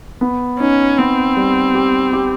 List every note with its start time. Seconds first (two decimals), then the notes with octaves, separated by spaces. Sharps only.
0.21 B3
0.59 C#4 D#4
0.98 B3 C4
1.37 G3
1.75 G4
2.13 G4